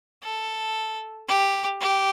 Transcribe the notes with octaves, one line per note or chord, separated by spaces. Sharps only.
A4
G4
G4